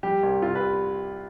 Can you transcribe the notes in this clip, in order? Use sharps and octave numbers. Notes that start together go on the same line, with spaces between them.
G3 G4
C2
C3 F4
B4